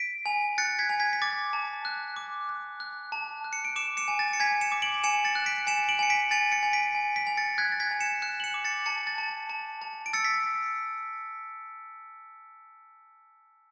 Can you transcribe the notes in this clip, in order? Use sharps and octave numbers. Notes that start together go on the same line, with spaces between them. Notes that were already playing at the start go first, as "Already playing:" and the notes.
Already playing: B6 D7
G#5
F#6 A6 C#7
G#6 B6
G#5
G#6 B6
B6
D6 A6
A5
F#6
D6
F#6
F#6
A5
F#6
C#7
D7
D6 C#7 E7
C#7 E7
G#5
A6
C#7
G#5 G#6 B6
C#7 E7
D6
D7 F#7
G#5 C#7 E7
A6 C#7
F#6
B6 D7
G#5 C#7 E7
D7 F#7
G#5 C#7
B6 D7
G#5 A6 C#7
A6 C#7
G#5
B6 D7
G#5
B6 D7
G#5
A6 C#7
F#6 G#6 B6
A6
G#6 B6
G#5
C#7 E7
F#6 C#7 E7
F#7
C#7 E7
D6
A6 C#7
A5 A6 C#7
A6
A5
A5
A5
D7
E6 A6 C#7
B6